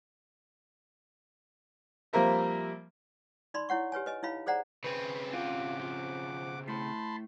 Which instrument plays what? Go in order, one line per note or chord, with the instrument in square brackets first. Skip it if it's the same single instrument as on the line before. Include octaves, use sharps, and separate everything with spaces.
[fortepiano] F3 G3 A#3 C4 A#4 E5
[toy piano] D#4 D5 B5 C6
E4 C#5 F#5 C#6
G4 B4 C#5 G#5
B4 D#5 G#5
D#4 E4 C#5 E5 F5 B5
G#4 C5 D5 F#5 A#5
[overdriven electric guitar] C#3 C4 [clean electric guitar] B4
[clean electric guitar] F4 [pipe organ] F#5 D6
[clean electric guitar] F3
[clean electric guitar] A2 [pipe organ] A5 B5 C6